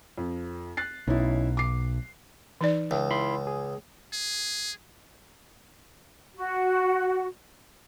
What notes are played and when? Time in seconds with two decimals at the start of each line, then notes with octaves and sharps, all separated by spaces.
0.18 F2
0.77 F#6 A6 C7
1.07 B1 C#4 D#4 E4
1.57 D6 C7
2.61 E3 D#4 D5
2.91 C#2 E5
3.10 E4 B5 C6
3.47 G#4
4.13 G#4
6.36 F#4